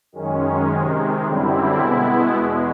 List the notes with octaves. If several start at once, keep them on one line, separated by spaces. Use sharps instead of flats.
F#2 D#3 G#3 C#4
C3 D#3 G#3
F#2 D3 G3 C4 E4
B2 G#3 B3 E4
E2 B2 G#3